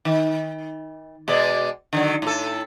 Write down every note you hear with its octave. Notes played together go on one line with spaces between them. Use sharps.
D#3
B2 G#3 D5
D3 D#3 F#3
A2 A4